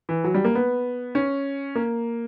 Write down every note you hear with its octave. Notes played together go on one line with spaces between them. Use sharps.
E3
F#3
G3
A#3
B3
C#4
A#3